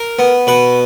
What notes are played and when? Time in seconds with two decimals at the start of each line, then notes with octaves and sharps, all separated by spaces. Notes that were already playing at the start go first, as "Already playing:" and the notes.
Already playing: A#4
0.19 B3
0.47 B2 B4